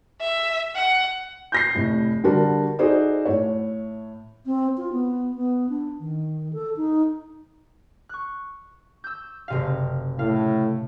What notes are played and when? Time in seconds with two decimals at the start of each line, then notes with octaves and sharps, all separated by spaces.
0.20 E5
0.75 F#5
1.52 G6 A#6 C7
1.75 F1 A2
2.24 D3 G3 F#4 A#4 A5
2.79 D#4 F#4 G#4 A4 C5 D5
3.25 A2 C#5
4.46 C4
4.77 F4
4.92 B3
5.36 B3
5.69 D4
6.00 D#3
6.53 A4
6.77 D#4
8.09 C#6 F#6
9.04 E6 G6
9.48 F#1 C3 F5
10.19 A2 F5